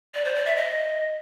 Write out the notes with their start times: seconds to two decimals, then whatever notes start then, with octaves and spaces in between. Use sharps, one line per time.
0.14 D5
0.25 C5
0.35 D5
0.46 E5
0.56 D#5